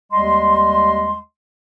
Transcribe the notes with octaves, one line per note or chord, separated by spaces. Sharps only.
D#2 G3 G#3 D#5 C6